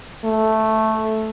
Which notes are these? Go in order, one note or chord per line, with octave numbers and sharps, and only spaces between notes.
A3